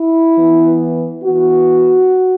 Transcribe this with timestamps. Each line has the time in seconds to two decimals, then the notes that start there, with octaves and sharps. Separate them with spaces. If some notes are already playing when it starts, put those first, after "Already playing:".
Already playing: E4
0.36 E3 B3
1.23 E3 B3 F#4